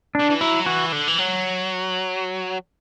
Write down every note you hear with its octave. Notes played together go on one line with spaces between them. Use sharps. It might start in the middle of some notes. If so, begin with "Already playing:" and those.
D3 D4
E3
F#3 E4
E3 F#4
D3
E3
F#3